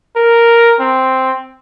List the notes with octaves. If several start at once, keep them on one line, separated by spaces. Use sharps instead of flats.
A#4
C4